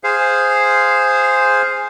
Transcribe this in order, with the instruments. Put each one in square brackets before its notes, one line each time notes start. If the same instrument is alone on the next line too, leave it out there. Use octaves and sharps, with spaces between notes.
[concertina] G#4 C5 F5